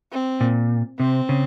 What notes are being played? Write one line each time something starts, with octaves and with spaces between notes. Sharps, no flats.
C4
A#2
C3 C4
C#3